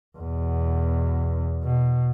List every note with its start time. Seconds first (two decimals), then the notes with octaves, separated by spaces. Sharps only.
0.18 E2 B2
1.64 B2